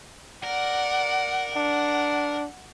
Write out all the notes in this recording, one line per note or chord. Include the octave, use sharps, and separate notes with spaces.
A#4 D5 F#5
D4 F#5